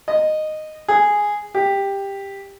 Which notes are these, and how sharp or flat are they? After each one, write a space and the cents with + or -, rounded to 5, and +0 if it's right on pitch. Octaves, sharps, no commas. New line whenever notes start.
D#5 -10
G#4 -5
G4 +10